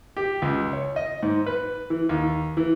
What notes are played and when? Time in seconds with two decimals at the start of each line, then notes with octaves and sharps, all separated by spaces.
0.17 G4
0.42 C#2
0.73 C#5
0.96 D#5
1.23 G#2
1.46 B4
1.90 E3
2.09 D#2
2.57 E3